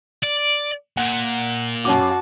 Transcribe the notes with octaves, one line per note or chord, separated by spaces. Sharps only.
D5
A#2 F#5
F#2 C#4 F#4 A5 D6